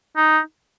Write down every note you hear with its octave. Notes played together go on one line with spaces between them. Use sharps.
D#4